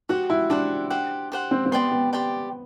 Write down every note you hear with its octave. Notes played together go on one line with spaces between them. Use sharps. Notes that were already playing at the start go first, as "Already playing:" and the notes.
F#4 G4 C5 F#5
E4
D4 G4 C5 F#5
G4 C5 F#5
G4 C5 F#5
C4
C4
B3 G4 D5 G5 C6
B3
G4 D5 G5 C6